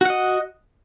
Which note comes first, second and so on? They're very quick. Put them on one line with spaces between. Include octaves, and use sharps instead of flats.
F#4 F#5 D#5